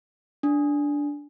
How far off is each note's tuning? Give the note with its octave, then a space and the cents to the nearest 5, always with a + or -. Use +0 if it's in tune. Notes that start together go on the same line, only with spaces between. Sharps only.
D4 -10